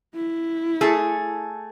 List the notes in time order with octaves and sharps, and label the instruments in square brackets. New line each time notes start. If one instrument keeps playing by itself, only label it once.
[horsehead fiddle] E4
[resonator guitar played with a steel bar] A3 G#4 A4